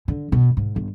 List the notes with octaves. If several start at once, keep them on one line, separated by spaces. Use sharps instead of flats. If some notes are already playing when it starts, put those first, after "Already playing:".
D3
B2
G#2
G1